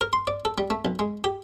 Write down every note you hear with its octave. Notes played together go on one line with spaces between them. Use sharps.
A#4
C6
D5
A4
G3
A3
B1
G#3
G4